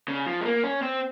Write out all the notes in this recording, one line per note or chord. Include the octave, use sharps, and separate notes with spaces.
C#3
F3
G#3
A#3
C#4
C4